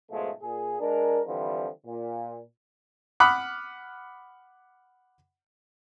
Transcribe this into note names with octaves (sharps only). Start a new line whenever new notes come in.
G#2 B2 F3 G#3 A3
A#2 G#4
G#3 D4 A#4
D3 E3 F3 G3 C4
A#2
F#5 B5 D6 D#6 F6 F#6